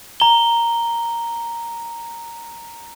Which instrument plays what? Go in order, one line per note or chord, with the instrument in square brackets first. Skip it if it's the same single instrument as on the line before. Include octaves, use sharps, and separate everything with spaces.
[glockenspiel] A#5 G7